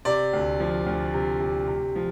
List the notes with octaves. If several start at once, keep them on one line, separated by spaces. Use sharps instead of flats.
C3 D5
D2
F3
D2
C3
C3
C3
F3